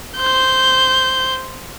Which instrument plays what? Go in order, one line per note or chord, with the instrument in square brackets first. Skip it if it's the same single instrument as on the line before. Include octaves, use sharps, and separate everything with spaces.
[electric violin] C5 G6